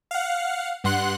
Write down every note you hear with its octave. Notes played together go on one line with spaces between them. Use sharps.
F5 F#5
G2 F#5 C6 F#6